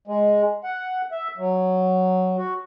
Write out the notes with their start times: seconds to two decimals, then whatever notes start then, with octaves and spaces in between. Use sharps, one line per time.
0.07 G#3
0.64 F#5
1.12 E5
1.38 F#3
2.38 F#4